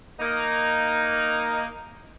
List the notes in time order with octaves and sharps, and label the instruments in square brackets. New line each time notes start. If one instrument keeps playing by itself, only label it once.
[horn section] A#3 D#4